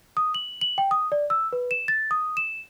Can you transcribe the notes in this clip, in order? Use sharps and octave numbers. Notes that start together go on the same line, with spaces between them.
D#6
F#7
F#7
G5
D#6
D5
E6
B4
E7
A6
D#6
E7